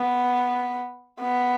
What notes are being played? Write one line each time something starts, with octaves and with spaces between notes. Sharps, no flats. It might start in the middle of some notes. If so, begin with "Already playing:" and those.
Already playing: B3
B3